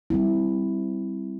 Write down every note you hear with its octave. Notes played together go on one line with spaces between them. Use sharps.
G3 C4 E4